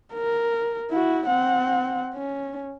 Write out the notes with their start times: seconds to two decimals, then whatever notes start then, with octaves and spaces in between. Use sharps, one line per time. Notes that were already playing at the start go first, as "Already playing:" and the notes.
0.14 A#4
0.91 E4 F#4
1.27 C4 F#5
2.15 C#4